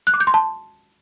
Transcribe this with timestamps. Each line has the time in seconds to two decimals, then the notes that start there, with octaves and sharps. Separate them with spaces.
0.07 F#6
0.14 D6
0.20 G6
0.27 C6
0.34 A5